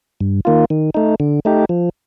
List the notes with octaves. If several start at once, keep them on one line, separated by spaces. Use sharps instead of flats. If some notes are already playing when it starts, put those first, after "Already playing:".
G2
D#3 A#3 F4
D#3
A3 D#4
D3
A3 D#4 G4
F3